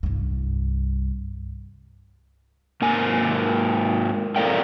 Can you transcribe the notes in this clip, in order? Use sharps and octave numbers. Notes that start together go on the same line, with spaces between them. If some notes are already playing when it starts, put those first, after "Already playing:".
C2 G2
G#2 A#3 G#5
A4 A#4 D5 F5 G5